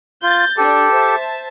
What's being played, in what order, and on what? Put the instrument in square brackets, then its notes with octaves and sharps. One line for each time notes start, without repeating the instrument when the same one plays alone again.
[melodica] F4 [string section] G6 A6
[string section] D4 [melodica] G4 A4
[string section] C5 E5 A5